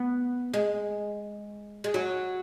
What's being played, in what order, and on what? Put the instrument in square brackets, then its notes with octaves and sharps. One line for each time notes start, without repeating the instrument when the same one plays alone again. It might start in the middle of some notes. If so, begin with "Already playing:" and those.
Already playing: [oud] B3
G#3
G#3
F#3